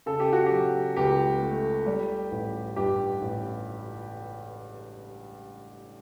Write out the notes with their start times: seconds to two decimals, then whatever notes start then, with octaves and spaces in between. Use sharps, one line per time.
0.06 C#3 A4
0.20 G4
0.33 F#4
0.46 G4
0.51 F#3
0.96 C#2 G4
1.42 A3
1.86 G3
2.31 A1
2.76 G2 G4
3.21 A1